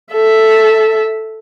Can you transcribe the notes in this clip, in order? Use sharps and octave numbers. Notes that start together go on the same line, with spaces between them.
A4 E5